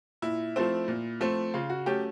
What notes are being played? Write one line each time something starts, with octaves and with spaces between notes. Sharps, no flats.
A#2 E4
F3 A3 C4
A#2
F3 A3 C4
C#3 F4
F#4
F#3 A3 C#4 G4